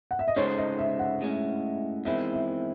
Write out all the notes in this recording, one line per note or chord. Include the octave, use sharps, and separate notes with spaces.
F#5
E5
D#5
C#3 G#3 D#4 A4 C5 C#5
D#5
E5
F#5
A2 G#3 C#4
E2 D#3 G#3 C4 E4 E5
E5